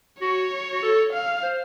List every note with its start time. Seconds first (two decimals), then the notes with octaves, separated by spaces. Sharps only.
0.20 F#4 C#5
0.72 F#4
0.82 A4
1.13 F5
1.43 C5